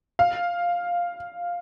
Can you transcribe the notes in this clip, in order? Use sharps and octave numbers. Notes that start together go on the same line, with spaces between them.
F5